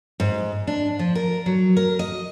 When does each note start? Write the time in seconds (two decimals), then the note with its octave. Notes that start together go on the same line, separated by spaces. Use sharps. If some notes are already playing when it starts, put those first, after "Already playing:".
0.20 G#2
0.67 D4
0.99 F3
1.15 A#4
1.46 F#3
1.76 A#4
1.99 D#5